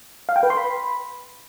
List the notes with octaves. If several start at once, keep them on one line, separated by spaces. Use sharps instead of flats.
F5
G5
B4
C6
B5